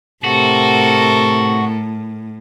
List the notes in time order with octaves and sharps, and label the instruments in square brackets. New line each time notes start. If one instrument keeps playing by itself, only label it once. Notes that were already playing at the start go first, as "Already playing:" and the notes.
[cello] A2 [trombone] C3 [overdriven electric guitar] F#4 [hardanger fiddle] A4 A#4